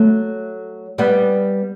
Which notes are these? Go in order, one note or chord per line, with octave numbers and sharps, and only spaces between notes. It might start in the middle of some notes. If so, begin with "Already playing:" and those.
Already playing: F#3 A3
G3 B3